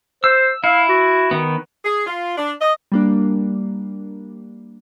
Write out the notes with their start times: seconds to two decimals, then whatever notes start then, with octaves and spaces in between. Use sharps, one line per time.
0.24 C5 E6
0.64 E4 F5
0.89 F#4
1.31 D#3 B3
1.84 G#4
2.06 F4
2.37 D4
2.61 D#5
2.92 G3 A#3 D4